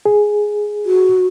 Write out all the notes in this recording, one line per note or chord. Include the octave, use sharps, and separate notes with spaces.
G#4
F#4